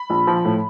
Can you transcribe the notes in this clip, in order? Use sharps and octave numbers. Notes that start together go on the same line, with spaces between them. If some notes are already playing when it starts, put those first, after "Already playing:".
Already playing: B5
A#1
F3
A2